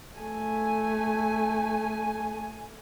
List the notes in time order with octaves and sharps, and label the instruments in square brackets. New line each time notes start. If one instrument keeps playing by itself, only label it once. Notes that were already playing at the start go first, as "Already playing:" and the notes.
[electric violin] A3 G#5